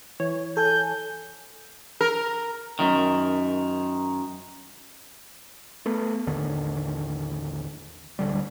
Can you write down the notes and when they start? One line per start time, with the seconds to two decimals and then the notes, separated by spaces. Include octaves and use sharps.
0.20 E3 C#5
0.57 A4 G#5 G6
2.01 A#4
2.79 F#2 D#3
5.86 A3 B3
6.27 A1 D#2 D3 D#3
8.19 A1 D2 D3 G3